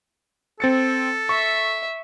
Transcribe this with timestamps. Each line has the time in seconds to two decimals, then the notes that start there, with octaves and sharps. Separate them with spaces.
0.60 C4 A4 A6 C#7
1.29 E5 C#6